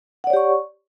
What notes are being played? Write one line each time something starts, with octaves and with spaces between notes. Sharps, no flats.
G4 C#5 D5 F#5 C#6